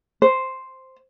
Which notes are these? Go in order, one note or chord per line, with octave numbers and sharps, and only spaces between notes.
C5